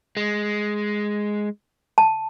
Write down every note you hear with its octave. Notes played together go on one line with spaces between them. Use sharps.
G#3
A5